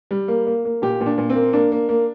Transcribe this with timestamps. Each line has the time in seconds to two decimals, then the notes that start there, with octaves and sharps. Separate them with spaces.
0.11 G3
0.28 A#3
0.47 A#3
0.65 A#3
0.82 A#2 G4
1.01 A#2
1.06 D4
1.18 A#2
1.30 C4
1.36 A#3
1.53 A#3 D4
1.72 A#3
1.89 A#3